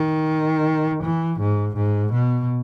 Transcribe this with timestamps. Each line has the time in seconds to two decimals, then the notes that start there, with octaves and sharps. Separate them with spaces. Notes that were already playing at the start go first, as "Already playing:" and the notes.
Already playing: D#3
1.03 E3
1.40 G#2
1.76 G#2
2.12 B2